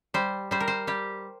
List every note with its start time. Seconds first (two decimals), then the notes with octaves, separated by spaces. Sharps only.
0.14 G3 C5
0.51 G3 C5
0.60 A#4
0.68 C5
0.87 G3 G4